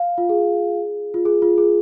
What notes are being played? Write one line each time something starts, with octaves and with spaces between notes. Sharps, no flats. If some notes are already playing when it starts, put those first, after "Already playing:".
Already playing: F5
F4
G#4
F4
G#4
F4
G#4